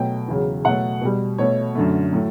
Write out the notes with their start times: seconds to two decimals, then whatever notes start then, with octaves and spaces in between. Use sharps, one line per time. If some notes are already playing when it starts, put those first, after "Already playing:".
Already playing: B2 F#3 A3 G5
0.28 E2 C#3 F#3
0.65 B2 F#3 A3 F#5
1.01 B2 G3
1.38 B2 A3 C#5
1.75 F#2 D3 A3
2.13 A2 F#3 A3